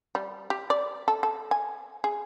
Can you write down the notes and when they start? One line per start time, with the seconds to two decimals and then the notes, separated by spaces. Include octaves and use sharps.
0.15 G3
0.50 G4
0.70 D5
1.08 A4
1.23 A4
1.51 G#5
2.04 G#4